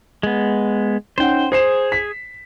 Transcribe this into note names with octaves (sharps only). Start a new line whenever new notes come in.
G#3 B3
C#4 D#4 C5 F#5 G5
G#4 C5 C7 E7
B6